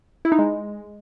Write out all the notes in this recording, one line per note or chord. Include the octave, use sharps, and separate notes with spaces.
E4
D#4
G#3